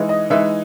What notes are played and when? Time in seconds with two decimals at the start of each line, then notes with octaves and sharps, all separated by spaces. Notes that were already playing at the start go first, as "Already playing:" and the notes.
Already playing: E3 G#3 D#4
0.09 D#5
0.30 E3 G#3 D#4 E5